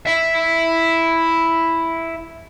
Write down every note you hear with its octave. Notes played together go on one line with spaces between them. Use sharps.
E4 E5